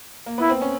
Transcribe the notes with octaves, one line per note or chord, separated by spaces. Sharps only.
A#3
B3 E4
C4
C#4